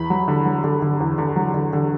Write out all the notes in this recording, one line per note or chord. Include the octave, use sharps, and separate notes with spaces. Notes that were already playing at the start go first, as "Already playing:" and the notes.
Already playing: E2 B5
F#3
D3
F#3
D3
D3
E2
D3
F#3
D3
D3